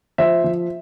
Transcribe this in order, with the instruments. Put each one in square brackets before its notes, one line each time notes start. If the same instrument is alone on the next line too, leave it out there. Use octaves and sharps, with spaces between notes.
[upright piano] F3 C5 E5
F3